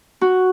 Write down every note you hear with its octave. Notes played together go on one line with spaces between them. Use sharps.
F#4